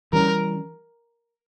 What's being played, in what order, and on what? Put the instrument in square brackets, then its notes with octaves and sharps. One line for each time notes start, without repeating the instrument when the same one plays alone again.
[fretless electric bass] E3 G3 C#4 [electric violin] A#4